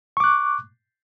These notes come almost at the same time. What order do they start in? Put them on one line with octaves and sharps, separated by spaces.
C#6 D6 F#6